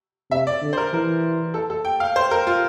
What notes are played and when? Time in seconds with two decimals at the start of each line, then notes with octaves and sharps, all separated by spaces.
0.31 C3 E5
0.47 D5
0.62 D3
0.73 C5
0.77 A#4
0.93 E3 A#4
1.54 A4
1.70 A4
1.85 G5
2.00 F5
2.16 C5
2.31 A#4
2.47 F4